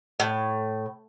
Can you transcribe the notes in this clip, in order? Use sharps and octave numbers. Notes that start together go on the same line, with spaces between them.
A2